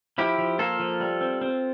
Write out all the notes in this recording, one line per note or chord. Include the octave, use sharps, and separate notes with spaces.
F3 E4 G4
F3
A#3 F4 A4
F3
G3
C4
C4